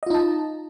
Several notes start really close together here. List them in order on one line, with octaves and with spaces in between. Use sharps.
D#5 F4 D#4 A5